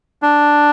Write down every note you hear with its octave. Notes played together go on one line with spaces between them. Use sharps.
D4